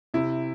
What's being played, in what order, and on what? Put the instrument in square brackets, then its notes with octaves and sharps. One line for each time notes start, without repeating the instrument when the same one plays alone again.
[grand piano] C3 [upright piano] E4